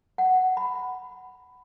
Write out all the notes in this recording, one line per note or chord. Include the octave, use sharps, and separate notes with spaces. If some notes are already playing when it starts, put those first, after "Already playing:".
F#5
B5